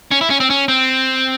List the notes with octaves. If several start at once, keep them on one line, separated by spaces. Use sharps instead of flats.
C#4
E4
C#4
C4
C#4
C4